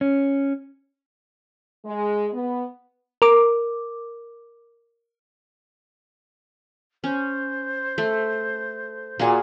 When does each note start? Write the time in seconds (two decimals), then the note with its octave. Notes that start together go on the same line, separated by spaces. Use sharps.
0.01 C#4
1.85 G#3
2.33 B3
3.22 A#4 D6
7.04 C#4 C5
7.98 A3
9.19 A#2 A#3 F#4 G#4